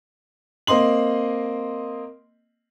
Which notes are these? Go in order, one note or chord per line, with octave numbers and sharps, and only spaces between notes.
A#3 C4 D#5 C6 F#7